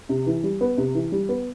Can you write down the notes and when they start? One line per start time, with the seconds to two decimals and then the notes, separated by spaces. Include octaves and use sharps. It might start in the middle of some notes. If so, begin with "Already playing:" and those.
0.09 C3
0.26 E3
0.43 G3
0.61 B3
0.78 C3
0.94 E3
1.12 G3
1.29 B3